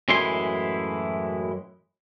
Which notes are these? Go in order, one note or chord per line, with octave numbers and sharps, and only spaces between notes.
F#2 A2 E3 G#3 E4 C6